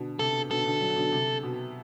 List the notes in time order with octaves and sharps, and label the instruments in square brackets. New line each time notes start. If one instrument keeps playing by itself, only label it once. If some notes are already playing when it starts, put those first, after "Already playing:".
Already playing: [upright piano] B2 D3
[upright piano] C3 [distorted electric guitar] A4
[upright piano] B2 D3 [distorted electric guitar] A4
[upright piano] B2 D3
D3 F#3
B2 D3
C3
B2